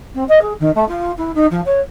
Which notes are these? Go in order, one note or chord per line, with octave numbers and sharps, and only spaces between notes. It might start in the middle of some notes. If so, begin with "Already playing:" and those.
C4
D#5
G#4
D#3
A3
F4
E4
D#4
F3
C#5